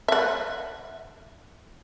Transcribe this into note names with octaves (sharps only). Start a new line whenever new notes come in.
E5 F#5